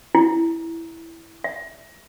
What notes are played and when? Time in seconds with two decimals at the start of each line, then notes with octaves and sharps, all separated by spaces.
0.15 E4
1.44 E5